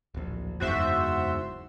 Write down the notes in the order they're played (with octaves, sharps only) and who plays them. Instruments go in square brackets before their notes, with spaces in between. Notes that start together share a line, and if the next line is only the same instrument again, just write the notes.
[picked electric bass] D1 A#1
[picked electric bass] F#1 E2 G#2 [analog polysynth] F#4 C5 E5